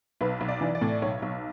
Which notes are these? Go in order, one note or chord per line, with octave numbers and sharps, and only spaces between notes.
B1 B4
B1
D5
E3
D5
A2
B1 C#5
B1